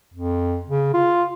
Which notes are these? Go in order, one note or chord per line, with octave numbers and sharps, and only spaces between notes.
F2
C#3
F4